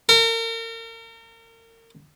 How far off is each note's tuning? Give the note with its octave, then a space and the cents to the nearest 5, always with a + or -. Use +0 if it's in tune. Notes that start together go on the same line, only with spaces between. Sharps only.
A#4 -35